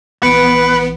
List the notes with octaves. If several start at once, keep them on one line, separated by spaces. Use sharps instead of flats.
A#1 E3 B3 B4 C#7 D7